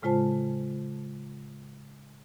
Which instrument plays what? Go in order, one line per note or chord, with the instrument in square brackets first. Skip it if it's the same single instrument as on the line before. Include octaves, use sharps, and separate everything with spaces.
[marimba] A2 C#3 G#3 F4 C5 A5